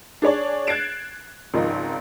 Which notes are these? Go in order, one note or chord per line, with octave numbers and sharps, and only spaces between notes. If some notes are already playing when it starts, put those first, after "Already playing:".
D4 G#4 C#5 D5
F#6 G#6 A6 C7 D7 E7
G#1 C#2 F3 D#4 A#4